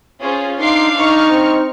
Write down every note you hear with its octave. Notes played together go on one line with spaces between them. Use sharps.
C#4 F4 G#4 C5
D4 D#4 F5 C6 D6 C7
D#4 C#6 F6
C4